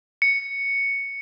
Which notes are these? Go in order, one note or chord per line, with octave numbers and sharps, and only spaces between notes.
C#7